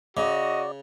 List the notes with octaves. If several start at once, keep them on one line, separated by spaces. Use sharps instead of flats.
C#3 F#4 D5 D#5